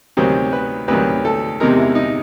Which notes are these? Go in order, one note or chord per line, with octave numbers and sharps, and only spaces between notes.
D2 C3 D#3 F#3 C5
B4
D2 C3 D#3 F#3 B4
A4
E2 C3 D#3 G#3 A#4
E4
D#4